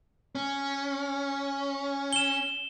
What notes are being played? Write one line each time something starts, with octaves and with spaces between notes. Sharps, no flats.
C#4
E7 G7